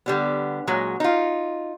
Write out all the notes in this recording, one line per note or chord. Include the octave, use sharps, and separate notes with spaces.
D3 G3 B3
A#2 F#3 G#3
D#4 F4